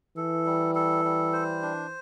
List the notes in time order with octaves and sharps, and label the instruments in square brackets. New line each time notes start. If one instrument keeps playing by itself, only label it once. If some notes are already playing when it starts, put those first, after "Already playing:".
[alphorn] E3 [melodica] A4
[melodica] G3
A4
G3
C5
D4